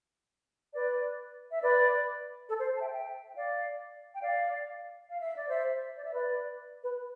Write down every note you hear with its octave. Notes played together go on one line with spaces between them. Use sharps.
B4 D5
E5
B4 D5
A4
C5
A5
E5 G5
E5 G5
G5
D5 F5
G5
D5 F5
F5
E5
D5
C5 E5
D5
E5
B4 D5
B4